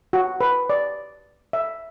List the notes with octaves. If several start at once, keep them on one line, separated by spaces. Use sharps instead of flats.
F#4
B4
D5
E5